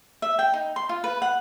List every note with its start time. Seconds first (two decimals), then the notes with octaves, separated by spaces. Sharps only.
0.22 E5
0.39 G5
0.54 D#4
0.76 C6
0.89 F4
1.04 B4
1.22 F#5